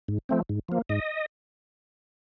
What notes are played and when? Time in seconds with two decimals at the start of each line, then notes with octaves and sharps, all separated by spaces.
0.08 G#2
0.29 F3 A3 C4
0.49 G#2
0.69 F3 A#3
0.89 G#2 D#5